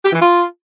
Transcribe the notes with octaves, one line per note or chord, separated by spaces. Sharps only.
G4
E3
F4